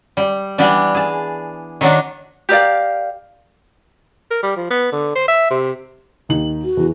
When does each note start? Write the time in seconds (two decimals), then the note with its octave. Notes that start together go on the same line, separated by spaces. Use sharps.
0.17 G3
0.58 E3 G3 B3 D4
0.94 G#4 A5
1.81 D#3 F#3 D4
2.49 G4 A#4 D5 F5
4.31 A#4
4.43 G3
4.57 F3
4.70 B3
4.92 D3
5.16 C5
5.28 E5
5.50 C3
6.29 D#2 D#4 F#7
6.64 F#4
6.77 E2 E3